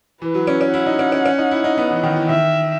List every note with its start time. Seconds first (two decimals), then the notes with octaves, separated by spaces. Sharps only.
0.22 E3 B4
0.34 F#3
0.47 C#4
0.61 C#4
0.73 E4 F#5
0.86 D#4
0.99 C#4
1.12 C#4
1.25 C#4
1.38 D#4
1.51 E4
1.64 D#4
1.77 B3
1.90 E3
2.03 D#3
2.16 E3
2.29 D#3 E5